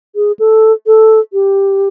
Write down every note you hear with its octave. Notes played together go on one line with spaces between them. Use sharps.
G#4
A4
A4
G4